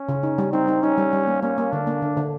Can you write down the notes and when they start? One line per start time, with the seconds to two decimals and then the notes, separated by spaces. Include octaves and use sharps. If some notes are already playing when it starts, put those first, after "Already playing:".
Already playing: C#4
0.09 C#3
0.23 D#4
0.38 G3
0.53 C4 D#4
0.68 D#4
0.83 C#4 D#4
0.98 G3
1.13 G3
1.27 A#3
1.43 A#3 C#4
1.58 A#3
1.72 D3 D4
1.87 A#3
2.02 D3
2.17 D3